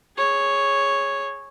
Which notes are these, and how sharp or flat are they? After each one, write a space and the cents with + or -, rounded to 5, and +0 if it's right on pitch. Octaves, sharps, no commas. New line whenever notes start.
G#4 +0 C#5 +0